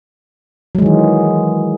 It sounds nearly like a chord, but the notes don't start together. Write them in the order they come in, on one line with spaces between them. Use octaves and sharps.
F#3 G#3 D#3 E3